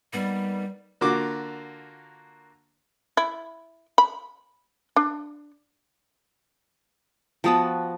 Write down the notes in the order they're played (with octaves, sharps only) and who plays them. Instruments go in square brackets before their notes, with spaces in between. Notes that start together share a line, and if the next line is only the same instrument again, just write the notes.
[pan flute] G3 [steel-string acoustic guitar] A#3 B3 D#4
[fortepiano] D3 A#3 F4 F#4 D6
[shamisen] E4
B5
D4
[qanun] F3 B3 F#4 [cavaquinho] G5 A5 D#6